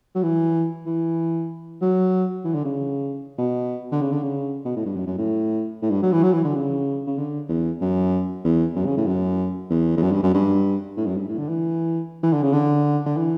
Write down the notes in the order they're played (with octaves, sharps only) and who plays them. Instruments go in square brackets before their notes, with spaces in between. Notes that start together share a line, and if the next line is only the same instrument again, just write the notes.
[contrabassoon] F#3
E3
E3
F#3
E3
D3
C#3
B2
D3
C#3
D3
C#3
B2
A2
G2
F#2
F#2
A2
A2
G2
F#3
E3
F#3
E3
D3
C#3
C#3
D3
E2
F#2
E2
F#2
C#3
A2
F#2
E2
E2
F#2
G2
F#2
G2
A2
F#2
G2
A2
D3
E3
E3
D3
C#3
D3
D3
E3